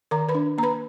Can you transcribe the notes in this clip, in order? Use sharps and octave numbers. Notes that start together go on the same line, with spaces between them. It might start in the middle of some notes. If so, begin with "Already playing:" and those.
D#3 A#4 A#5
B4 B5
D4
A#3 A#5
B4 B5